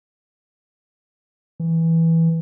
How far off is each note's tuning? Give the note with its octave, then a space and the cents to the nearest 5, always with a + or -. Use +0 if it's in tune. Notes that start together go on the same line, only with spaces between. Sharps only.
E3 -5